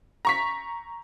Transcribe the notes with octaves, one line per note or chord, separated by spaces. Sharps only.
A#5 C#6 B6